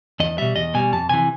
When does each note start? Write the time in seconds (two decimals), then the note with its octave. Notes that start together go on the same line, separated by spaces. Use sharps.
0.20 E2 D#5
0.38 B2 G3 E5
0.56 E2 D#5
0.74 B2 G3 G#5
0.92 F2 A5
1.09 C3 E3 G#5